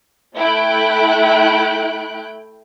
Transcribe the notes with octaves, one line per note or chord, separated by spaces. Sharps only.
A3 E4 G5 F#6 D7